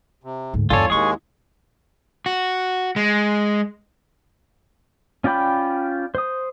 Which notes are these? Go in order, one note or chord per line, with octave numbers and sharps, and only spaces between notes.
C3
D2 G#2
E2 G2 F4 A4 C#5 D5 G#5
D#2 G#3 C#4 E4 G#4 C#6
F#4
G#3
C#4 F4 D5 G5 B5
C5 D#6